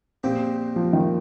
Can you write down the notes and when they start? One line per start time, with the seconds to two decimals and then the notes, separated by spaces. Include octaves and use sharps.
0.24 A#1 A#2 A#3 C4 G4
0.76 F3
0.93 D#3